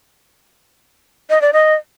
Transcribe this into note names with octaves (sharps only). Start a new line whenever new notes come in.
D#5
D5
D#5